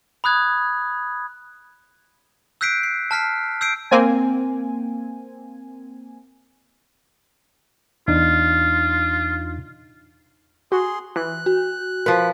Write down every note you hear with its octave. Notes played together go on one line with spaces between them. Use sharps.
B5 D#6 F#6 G#6
E6 F#6 G6 B6 C7 D7
C7
A5 F6 B6 C7
E6 G6 C7 D7
A#3 C4 G#5
E2 D4 D#4 F4
F#4 G#4 C6
E3 F#6
F#4
F3 A#4 B4